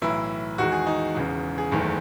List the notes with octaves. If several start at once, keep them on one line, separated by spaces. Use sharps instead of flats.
B1 A2 E3 E4
E2 D#3 G#3 F#4
G#4
D#4
E1 E2 C#3
G#4
F#1 E2 D#3 A3